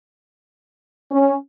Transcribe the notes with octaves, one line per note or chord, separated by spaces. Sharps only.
C#4